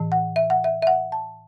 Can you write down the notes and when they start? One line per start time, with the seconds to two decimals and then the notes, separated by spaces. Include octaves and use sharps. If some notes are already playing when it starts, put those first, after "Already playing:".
Already playing: A2 E3
0.12 F#5
0.36 E5
0.50 F#5
0.64 E5
0.82 E5
0.87 F#5
1.12 A5